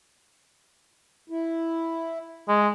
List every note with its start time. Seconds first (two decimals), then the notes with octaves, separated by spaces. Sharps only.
1.30 E4
2.48 G#3